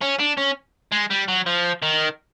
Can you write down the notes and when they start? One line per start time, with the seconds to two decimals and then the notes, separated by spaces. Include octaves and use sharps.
0.01 C#4
0.19 D4
0.37 C#4
0.92 G#3
1.10 G3
1.28 F#3
1.46 F3
1.82 D#3